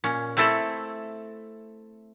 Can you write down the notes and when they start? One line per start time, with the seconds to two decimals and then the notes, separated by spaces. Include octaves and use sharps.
0.04 A#2 C#4
0.37 A3 C4 E4 A4